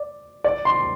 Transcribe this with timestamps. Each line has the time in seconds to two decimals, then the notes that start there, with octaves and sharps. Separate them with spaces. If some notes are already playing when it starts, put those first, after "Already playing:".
Already playing: D5
0.44 D5
0.65 C6